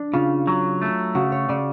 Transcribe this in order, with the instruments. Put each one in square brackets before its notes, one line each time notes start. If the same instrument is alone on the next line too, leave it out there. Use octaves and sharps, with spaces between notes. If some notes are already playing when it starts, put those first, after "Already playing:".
Already playing: [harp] D4
[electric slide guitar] C#3 [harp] F4
[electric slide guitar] F#3
A3
[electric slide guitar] C#3 [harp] F#4
[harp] C#5
[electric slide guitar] C#3 [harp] D5